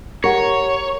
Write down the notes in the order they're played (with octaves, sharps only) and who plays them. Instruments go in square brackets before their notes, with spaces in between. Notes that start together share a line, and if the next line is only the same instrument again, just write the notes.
[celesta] G4 F#5 C#6 [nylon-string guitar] A#4 [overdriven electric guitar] C#5